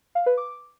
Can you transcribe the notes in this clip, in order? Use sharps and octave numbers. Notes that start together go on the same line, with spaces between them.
F5
B4
D6